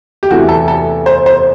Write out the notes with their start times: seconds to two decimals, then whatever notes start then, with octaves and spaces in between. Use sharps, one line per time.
0.23 G4
0.30 E2 C3 E3 A3 E4 F#4
0.49 A4
0.68 A4
1.06 C5
1.26 C5